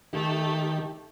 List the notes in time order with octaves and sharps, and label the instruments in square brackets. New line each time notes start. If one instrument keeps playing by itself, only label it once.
[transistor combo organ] D#3 G4 [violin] A3